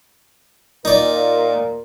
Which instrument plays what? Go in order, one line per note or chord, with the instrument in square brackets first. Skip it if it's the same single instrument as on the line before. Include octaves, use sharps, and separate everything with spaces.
[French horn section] A#2 A#4 [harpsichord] D#4 D5